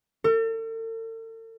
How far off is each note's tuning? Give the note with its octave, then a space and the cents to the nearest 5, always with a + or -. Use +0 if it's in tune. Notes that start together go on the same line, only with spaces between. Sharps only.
A4 +45